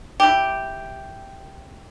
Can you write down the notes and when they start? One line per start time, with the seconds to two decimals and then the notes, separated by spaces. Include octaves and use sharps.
0.20 E4 G4